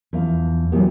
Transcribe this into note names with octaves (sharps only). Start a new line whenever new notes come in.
E2 F3 F5
A#2 E3 F#3 G3 B3